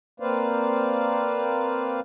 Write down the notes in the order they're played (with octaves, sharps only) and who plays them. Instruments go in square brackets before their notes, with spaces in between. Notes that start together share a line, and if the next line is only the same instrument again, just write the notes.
[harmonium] A#3 C4 B4 C5 D5 F5